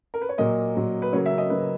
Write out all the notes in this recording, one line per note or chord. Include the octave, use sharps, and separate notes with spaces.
A#4
B4
C#5
A#2 F#3 A#3 D#5
A#2 F#3 A#3
B4
C#3 F#3 A#3 C#5
E5
D#5
C#3 F#3 A#3 B4